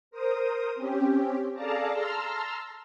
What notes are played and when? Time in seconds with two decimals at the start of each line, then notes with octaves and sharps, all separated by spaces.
0.11 A#4 C5 D#6
0.75 C4 C#4 G4
1.53 G#4 A4 D5 F5 A5 A#5
1.92 A5 A#5 C6 E6 F6